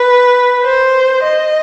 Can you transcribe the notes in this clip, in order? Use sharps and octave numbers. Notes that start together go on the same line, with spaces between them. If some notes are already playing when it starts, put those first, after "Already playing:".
Already playing: B4
C5
D#5